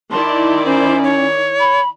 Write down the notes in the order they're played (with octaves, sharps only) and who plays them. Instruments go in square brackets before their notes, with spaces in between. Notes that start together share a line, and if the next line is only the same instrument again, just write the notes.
[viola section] D#3 E4 D5 [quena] A5 [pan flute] C6
[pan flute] C#4 [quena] C5
[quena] C#5
[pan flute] B5